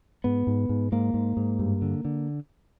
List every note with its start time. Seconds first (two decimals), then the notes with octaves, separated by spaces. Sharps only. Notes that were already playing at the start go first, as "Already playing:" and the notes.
0.24 G#2 B3
0.47 G#2
0.69 G#2
0.92 G#2 A#3
1.14 G#2
1.37 G#2
1.59 G2
1.82 D3
2.05 D3